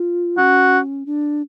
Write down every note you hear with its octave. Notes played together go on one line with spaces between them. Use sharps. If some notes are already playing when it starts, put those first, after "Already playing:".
Already playing: F4
C#4 F#4
D4